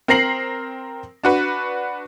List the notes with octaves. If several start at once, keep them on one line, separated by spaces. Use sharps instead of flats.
C4 A#4 A#5 A#6 C7 F#7
D4 F#4 B4